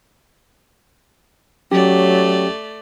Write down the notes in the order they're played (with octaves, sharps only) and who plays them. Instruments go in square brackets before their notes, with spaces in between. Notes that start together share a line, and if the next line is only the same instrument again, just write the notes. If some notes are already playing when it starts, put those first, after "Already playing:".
[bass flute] F#3 [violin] A3 D5 [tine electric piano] C#4 G4